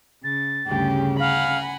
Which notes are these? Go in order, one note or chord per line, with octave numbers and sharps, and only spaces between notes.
C#3 A6
D2 G2 C#3 G4
F5 F#5 G#5 A#5 B5